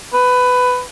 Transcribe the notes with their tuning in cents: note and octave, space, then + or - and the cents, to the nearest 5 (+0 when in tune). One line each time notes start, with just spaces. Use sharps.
B4 +15